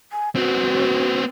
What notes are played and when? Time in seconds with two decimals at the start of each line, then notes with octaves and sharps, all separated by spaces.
0.12 G#5
0.36 B3 C4 F#4